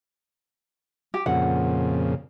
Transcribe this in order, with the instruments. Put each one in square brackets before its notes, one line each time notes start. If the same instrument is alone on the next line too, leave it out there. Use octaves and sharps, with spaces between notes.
[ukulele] G4
[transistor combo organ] F2 A#2 C#3 [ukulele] F#5